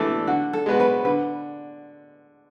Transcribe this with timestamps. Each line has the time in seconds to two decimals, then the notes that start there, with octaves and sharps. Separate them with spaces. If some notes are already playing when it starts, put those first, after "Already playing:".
Already playing: E3 A3 D4 A4
0.27 D3 F#4
0.53 A4
0.66 G#3 B3 F#4
0.80 B4
1.05 D3 B4